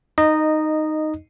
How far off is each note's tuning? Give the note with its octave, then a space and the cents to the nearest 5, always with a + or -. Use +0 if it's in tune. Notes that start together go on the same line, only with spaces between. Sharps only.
D#4 -5 D#5 -15